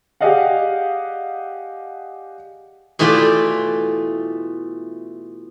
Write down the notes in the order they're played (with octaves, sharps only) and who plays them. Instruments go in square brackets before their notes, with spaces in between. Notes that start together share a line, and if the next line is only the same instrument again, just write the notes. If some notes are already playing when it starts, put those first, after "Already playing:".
[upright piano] G4 G#4 D5 D#5 F5 F#5
[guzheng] B2 E3 A3 F4 G4 D5